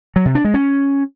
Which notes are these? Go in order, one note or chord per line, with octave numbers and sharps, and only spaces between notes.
F#3
C3
D4
G#3
C#4